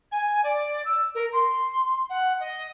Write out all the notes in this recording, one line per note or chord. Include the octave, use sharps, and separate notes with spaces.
G#5
D5
E6
A#4
C6
F#5
D#5